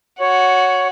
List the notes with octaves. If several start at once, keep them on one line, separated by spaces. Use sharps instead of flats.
F#4 C#5